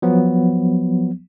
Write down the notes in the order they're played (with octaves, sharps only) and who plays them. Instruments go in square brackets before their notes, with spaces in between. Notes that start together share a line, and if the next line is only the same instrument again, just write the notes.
[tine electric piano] F3 F#3 B3